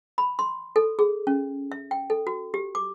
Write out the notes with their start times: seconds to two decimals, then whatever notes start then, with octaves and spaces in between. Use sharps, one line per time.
0.18 B5
0.39 C6
0.76 A4
0.99 G#4
1.27 C#4
1.72 E5
1.91 G5
2.10 A4
2.27 F#4
2.54 G4
2.75 D6